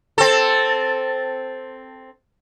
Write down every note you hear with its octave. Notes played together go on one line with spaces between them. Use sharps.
C4 A4